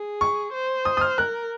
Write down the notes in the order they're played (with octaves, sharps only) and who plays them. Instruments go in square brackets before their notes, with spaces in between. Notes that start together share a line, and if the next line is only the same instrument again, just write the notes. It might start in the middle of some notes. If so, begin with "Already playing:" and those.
Already playing: [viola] G#4
[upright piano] C#6
[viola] C5
[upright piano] D#6
D#6
F6
[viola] A#4 [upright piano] F#6